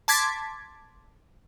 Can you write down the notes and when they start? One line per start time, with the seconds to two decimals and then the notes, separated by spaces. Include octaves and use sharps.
0.08 A5 C6 D6 G#6 A6 B6